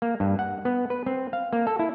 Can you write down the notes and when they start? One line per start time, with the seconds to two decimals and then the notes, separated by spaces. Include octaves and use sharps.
0.02 A#3
0.20 G2
0.39 F#5
0.65 B3
0.90 B4
1.06 C4
1.33 F5
1.53 A#3
1.67 A4
1.79 E4